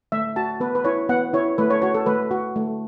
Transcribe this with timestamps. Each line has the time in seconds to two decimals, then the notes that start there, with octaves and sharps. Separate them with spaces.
0.12 A3 E5
0.36 F#4 A5
0.60 B3 B4
0.75 B4
0.85 E4 C#5
1.09 B3 F#5
1.34 E4 C#5
1.58 A3 B4
1.70 C#5
1.82 F#4 C#5
1.94 A4
2.06 A3 B4
2.31 F#4
2.56 A3